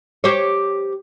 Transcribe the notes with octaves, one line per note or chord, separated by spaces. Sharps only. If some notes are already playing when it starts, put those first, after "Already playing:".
G4 C5 C#5